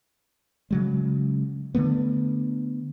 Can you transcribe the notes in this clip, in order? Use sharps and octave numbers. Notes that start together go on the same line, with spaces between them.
C#3 F#3 G#3
D3 D#3 A3 B3